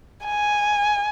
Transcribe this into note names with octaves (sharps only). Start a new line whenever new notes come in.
G#5